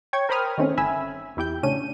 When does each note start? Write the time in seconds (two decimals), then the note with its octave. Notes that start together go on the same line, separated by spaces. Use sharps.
0.13 C#5 G5 C#6 G#6
0.29 A#4 C5 G5 B5 D#6 F6
0.58 D#3 A3 C4 C#4
0.77 G1 E5 G#5 B5 E6
1.37 E2 E4 G4 G5 G6
1.63 A2 C#3 C#4 D4 D#7